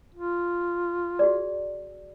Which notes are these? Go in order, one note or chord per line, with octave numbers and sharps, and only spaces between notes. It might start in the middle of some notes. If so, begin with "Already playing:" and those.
F4
F#4 G#4 D5